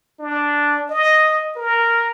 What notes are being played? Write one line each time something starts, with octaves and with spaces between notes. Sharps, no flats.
D4
D#5
A#4